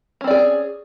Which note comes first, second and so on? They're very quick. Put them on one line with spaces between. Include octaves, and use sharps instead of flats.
C#4 C4 D5 G#4